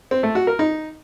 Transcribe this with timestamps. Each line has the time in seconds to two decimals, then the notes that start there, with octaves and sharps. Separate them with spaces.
0.11 C4
0.23 A3
0.35 F#4
0.47 A#4
0.59 D#4